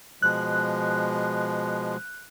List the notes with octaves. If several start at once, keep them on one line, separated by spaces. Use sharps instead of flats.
B2 F3 G#3 F#6